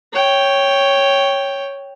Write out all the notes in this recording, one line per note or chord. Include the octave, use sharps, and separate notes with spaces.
C#5 G5